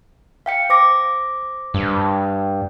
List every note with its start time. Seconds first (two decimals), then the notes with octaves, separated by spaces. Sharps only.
0.46 F5 G5 C#7
0.70 C5 D6 A#6
1.74 G2